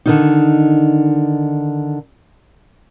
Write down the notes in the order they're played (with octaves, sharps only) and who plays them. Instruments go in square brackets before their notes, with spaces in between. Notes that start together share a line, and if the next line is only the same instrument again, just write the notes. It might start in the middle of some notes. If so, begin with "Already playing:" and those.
[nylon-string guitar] D3 D#3 D#4